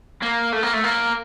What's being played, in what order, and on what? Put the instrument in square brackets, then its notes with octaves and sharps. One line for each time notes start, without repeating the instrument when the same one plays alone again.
[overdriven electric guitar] A#3
A3
A#3
A3
A#3